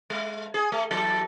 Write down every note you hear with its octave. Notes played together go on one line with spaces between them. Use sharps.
G#3
G#4
A3
E2 F#3 A4